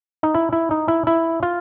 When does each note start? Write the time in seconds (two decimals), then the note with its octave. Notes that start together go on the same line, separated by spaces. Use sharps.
0.23 D#4
0.34 E4
0.53 E4
0.71 D#4
0.88 E4
1.07 E4
1.43 F4